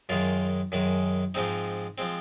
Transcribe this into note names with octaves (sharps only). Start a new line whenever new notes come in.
F#2 D#3 G#3 F4
F#2 D#3 G#3
G#2 F3 G#3 C4 D#4
F3 G#3 C4